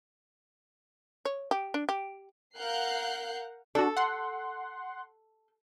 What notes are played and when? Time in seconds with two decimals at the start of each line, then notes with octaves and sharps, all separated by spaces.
1.25 C#5
1.51 G4
1.74 D4
1.89 G4
2.57 A#4 F5 F#5 F#6 G6 C7
3.75 D4 F#4 A4
3.97 F#5 C6